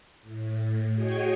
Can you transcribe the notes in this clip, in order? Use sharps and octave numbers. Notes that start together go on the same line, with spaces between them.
A2
F#4 G#4 C#5 D#5 G5 G#5